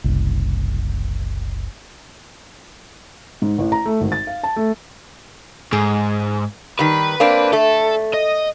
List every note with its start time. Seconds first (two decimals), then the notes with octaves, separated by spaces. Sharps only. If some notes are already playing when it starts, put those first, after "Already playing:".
0.04 F#1 C2
3.42 G#2
3.58 A1
3.72 A#5
3.86 A3
4.00 G#1
4.12 A6
4.27 F5
4.43 A5
4.56 A3
5.73 G#2 G#4
6.79 D#3 G3 B4
7.20 A#3 C4 D4
7.53 A3 A4
8.13 D#5